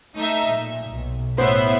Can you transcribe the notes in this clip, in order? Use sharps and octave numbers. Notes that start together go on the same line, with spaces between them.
A3 D#4 E5
A#2
B1
A2 B3 C5 E5